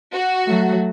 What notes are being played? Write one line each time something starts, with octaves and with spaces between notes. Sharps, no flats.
F#4
F#3 A3